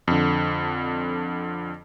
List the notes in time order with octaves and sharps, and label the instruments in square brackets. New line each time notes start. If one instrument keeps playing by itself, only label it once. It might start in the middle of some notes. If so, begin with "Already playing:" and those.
[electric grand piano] F2 D3